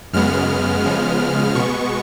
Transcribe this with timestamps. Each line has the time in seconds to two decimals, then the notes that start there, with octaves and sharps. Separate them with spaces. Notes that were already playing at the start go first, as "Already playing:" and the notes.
0.13 F#2 C#3 G#3 B3 F6
0.85 C#3 F3 G#3 B3
1.55 B2 G#3 B3 C#6